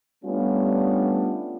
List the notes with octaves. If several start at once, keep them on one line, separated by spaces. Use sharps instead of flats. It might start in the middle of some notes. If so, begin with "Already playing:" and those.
G3 A3 B3 C#4 D4 F4